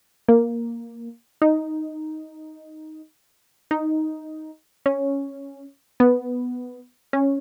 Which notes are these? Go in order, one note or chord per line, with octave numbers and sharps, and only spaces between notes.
A#3
D#4
D#4
C#4
B3
C#4